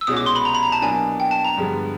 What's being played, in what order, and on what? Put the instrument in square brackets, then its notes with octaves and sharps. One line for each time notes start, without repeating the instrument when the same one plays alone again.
[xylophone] E6
[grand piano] C2 B2 G#3 C#4 F#4 [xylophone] D#6
[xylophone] D6
C6
B5
A#5
B5
A#5
A5
[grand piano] B2 F#3 A#3 D4 [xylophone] G#5
[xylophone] G5
A5
A#5
[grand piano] G2 D3 F3 G#3 B3